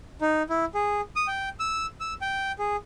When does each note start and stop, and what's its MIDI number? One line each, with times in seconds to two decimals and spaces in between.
0.21 0.43 63
0.49 0.65 64
0.74 1.01 68
1.16 1.27 87
1.27 1.49 79
1.60 1.86 88
2.00 2.14 88
2.21 2.52 79
2.59 2.76 68